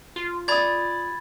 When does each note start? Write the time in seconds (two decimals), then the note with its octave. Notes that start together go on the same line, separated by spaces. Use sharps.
0.16 F4
0.48 D5 B5 D#6 G#6 A6